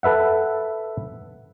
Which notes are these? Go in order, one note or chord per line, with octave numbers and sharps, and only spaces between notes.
A4 B4 E5 F#5